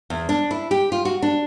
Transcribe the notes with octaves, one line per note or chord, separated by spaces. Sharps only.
E2
D4
E4
G4
F4
F#4
D4